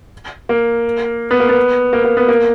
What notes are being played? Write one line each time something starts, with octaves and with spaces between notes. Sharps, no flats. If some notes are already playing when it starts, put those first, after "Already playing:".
A#3
B3
A#3
B3
A#3
A#3
B3
A#3